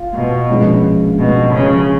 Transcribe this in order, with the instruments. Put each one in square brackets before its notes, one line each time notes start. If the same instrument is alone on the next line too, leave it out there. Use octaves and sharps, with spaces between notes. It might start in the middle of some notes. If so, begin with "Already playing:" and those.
Already playing: [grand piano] F4
[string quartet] B2
[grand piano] A#1 A#2 G#3 C#4 F4
[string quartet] B2
C#3